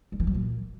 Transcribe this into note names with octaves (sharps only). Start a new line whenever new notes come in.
G3
E3
F#3
A#2